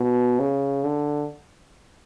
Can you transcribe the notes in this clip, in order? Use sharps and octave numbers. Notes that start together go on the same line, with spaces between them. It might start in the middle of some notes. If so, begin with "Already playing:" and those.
Already playing: B2
C#3
D3